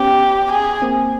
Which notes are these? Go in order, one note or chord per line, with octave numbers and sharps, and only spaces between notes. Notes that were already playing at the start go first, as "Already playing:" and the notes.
Already playing: B3 C#4 G4
G#4
A#3 C4